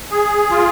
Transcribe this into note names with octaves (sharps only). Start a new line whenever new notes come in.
G#4
F4